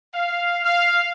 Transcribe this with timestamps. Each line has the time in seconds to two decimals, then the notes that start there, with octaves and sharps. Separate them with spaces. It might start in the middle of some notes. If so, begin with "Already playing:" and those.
0.13 F5
0.63 F5